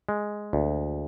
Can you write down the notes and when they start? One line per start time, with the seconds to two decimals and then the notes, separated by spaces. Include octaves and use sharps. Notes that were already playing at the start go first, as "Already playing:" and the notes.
0.09 G#3
0.53 D2